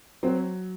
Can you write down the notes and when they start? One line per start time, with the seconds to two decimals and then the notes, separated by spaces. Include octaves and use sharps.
0.23 F#3 C4